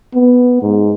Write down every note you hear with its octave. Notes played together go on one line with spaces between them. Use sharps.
B3
G#2